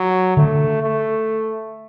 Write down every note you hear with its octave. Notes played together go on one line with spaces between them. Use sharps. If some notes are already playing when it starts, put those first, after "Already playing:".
Already playing: F#3
D3 A3
A3